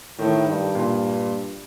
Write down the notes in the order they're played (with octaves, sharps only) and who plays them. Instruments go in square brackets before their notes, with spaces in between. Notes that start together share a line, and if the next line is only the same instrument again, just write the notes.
[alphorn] A2 [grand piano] D#3
[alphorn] G2
[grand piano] A#2